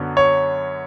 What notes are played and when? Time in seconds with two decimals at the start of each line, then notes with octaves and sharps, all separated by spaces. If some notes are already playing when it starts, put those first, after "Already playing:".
Already playing: F#2 D3 F#3 B3
0.17 C#5